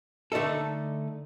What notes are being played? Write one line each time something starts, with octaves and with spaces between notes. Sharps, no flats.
D3 A3 D4 D#4 A4